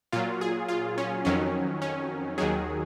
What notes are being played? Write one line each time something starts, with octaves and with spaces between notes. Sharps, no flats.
A#2 F#3 F4
G#4
F4
C#4
F2 D#3 F#3 C#4
C#4
D#2 D#3 F#3 G#4